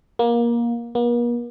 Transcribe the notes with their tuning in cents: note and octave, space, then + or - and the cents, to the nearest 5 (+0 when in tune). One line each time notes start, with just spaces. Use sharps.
A#3 +20
A#3 +45